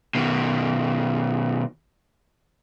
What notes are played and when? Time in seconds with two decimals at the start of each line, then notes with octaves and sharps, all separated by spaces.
0.15 B2 D#3